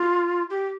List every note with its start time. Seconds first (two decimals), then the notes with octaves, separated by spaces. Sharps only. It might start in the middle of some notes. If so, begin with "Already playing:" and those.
Already playing: F4
0.50 G4